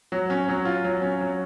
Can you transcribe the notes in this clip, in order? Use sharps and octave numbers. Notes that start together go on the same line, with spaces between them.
F#3
C#4
F#3
F4
F#3
C#4
F#3